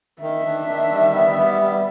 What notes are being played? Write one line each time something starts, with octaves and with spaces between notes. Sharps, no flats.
D#3 E5
D4
D#3
G3
B3
G3
G3